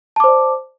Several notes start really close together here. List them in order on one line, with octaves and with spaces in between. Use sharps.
A5 D6 C5 D5